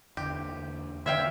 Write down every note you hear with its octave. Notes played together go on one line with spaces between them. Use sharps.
E2 D3 G4
D3 E3 C4 C#5 E5 F5 G5